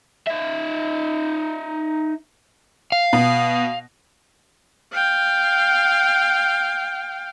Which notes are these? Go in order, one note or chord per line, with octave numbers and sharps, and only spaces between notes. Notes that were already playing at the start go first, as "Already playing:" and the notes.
D#4 E5
F5
B2
F5 G5